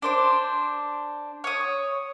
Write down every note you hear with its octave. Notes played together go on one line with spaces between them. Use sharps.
D4 C5 D6
C#5 D#6